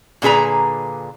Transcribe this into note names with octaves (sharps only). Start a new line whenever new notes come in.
A#2 D3 G#4 B4 A#5